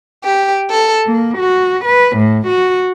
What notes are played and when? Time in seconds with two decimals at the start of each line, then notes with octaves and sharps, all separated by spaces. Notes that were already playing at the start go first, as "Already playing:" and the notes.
0.25 G4
0.70 A4
1.06 A#3
1.38 F#4
1.85 B4
2.17 A2
2.47 F#4